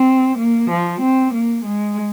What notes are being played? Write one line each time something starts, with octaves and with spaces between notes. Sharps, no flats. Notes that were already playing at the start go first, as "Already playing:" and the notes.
Already playing: C4
A#3
F3
C4
A#3
G#3